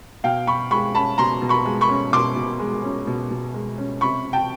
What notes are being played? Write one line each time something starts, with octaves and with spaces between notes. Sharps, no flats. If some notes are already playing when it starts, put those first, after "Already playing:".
B2 F5 G5
B2 B5 C#6
G#3 B5 C#6
C#4 A5 B5
B2 A#5 C6
B2
B5 C#6
G#3
B5 C#6
C#4
B2 C6 D6
B2
G#3
C#4
B2
B2
G#3
C#4
C3 B5 C#6
C3
G5 A5